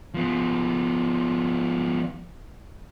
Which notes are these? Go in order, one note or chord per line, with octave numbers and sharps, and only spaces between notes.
F3 B3